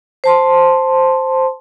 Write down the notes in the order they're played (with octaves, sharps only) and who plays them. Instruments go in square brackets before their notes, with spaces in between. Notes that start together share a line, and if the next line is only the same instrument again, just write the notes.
[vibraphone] C5 A5 C6